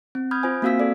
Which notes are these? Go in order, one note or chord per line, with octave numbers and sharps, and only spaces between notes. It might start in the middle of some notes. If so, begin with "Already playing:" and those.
C4
B5 D#6 F6 G6 G#6
F4 C5 G#5
A#3 C4 F#4 F5 E6 B6
A4 D5